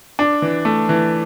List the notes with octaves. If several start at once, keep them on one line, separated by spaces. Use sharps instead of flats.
D4
E3
A3
E3